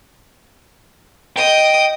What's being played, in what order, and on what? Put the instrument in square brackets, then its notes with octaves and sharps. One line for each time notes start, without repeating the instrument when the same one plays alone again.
[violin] D#5 D#6 [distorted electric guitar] G5